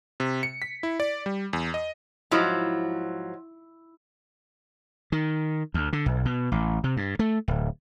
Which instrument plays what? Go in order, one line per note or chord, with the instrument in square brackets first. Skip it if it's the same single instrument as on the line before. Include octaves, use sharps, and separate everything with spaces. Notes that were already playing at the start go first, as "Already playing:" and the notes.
[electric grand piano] C3
C#7
B6
E4
D5
G3
E2
D#5
[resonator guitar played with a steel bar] G#2 F3 F#3 [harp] E4
[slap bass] D#3
D2
D3
B1
B2
A1
C3
G2
A3
D1